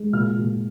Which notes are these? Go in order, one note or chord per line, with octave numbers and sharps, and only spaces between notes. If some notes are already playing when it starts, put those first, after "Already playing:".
Already playing: G#3
A#2 F6
A#2